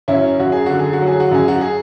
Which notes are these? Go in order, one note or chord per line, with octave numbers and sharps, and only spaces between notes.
F#2 C#4 E4
F#2 F#4
G#4
D3 F#4
G#4
F#4
F#3
G#4
F#4
F#2 G#4
F#4
G#4